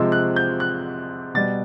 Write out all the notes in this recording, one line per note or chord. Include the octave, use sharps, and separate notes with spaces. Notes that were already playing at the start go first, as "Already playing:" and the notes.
Already playing: C3 F3 G#3 E6
F#6
G6
F#6
B2 G3 A6